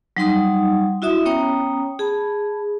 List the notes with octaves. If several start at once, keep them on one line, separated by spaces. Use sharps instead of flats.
F#3 G3 D#4 F#5 C6 D#6
E4 F#4 E5 D#6
B3 C#4 C#5 G5 A#5 D#6
G#4 A5 B5